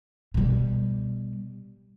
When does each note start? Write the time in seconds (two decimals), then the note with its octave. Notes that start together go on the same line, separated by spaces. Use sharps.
0.34 B2 G3